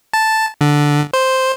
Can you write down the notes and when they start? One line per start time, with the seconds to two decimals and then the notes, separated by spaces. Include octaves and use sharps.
0.13 A5
0.61 D3
1.13 C5